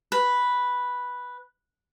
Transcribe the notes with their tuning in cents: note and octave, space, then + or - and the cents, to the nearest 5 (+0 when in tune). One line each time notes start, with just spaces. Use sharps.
B4 -5